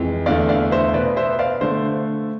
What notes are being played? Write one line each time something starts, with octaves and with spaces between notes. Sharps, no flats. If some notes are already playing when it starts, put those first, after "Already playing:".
Already playing: F2 E3 G#3
E2 D3 A3 D5 F5
D5 F5
C5 E5
B2 B3 B4 D5
C5 E5
D5 F5
D3 A3 C5